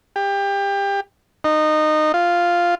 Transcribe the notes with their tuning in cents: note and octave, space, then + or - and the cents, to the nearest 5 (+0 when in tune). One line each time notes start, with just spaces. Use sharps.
G4 +25
D#4 -20
F4 -5